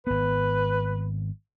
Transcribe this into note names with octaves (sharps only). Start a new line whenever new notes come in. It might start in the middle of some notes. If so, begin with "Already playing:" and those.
G#1 B3 B4